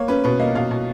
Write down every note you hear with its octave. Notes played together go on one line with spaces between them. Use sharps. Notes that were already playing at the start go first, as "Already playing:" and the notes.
Already playing: A#3 C#5
C#4 B4
B2 B4
A#3 D#5
B2 F5
B2